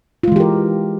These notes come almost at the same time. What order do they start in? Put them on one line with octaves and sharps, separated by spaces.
F4 G#3 E3 G4 A#4